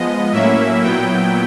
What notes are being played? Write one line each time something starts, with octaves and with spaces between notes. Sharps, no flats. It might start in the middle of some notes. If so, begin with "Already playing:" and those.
Already playing: F3 G#3 B3 D#5
A2 F#3 A#3 C#4 E4 E5
A#2 F#3 B3 E4 G5